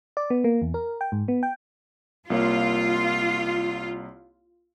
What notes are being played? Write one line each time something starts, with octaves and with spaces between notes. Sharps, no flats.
D5
B3
A#3
E2
A#4
G5
G#2
B3
G5
C2 A#3 F4 C#5